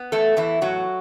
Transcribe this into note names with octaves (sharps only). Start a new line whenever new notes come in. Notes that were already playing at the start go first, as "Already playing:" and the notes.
Already playing: B3
E2 A3 A4
E2 E3 E4
A2 F#3 F#4